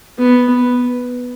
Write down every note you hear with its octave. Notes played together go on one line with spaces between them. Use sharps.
B3